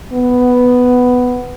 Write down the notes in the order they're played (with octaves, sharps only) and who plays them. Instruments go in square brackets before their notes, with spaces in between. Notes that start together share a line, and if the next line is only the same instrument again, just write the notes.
[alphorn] B3